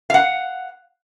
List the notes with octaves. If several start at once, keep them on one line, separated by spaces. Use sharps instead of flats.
F5 F#5